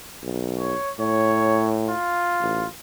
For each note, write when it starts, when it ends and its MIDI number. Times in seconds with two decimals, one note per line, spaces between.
0.23 0.74 35
0.58 0.92 73
0.99 1.93 45
0.99 1.72 73
1.89 2.68 65
2.41 2.66 33